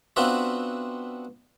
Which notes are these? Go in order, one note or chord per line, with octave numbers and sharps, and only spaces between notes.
B3 C4 D4 F4 F#4 E5